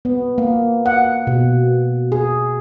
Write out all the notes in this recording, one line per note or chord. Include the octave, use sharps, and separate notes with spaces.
B3
A#3
F#5
B2
G#4